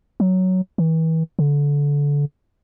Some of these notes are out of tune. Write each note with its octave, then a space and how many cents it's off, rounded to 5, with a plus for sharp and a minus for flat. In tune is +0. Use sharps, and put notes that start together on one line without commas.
F#3 +5
E3 -35
D3 -25